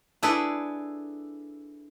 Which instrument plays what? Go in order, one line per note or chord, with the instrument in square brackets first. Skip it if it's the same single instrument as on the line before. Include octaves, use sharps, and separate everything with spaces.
[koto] D4 E4 G#4 A4 B4